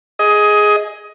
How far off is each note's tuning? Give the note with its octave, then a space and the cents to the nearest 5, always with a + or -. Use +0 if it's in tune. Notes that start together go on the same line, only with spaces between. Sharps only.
G#4 +5 D#5 +15